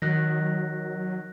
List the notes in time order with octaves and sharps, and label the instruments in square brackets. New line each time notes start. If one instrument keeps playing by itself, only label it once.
[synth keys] D#3 [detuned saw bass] F#3 [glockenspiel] F#6 A#6